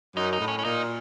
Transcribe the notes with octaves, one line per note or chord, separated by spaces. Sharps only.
F#2 D#4
D#4
A2
C#4
C#4
A#2 D#4